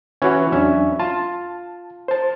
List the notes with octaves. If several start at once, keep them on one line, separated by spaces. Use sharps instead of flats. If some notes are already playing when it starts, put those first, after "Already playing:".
E3 C#4 F#4 C#5
E2 F#3 C#4 D4 E5
F4 A5
C5 A5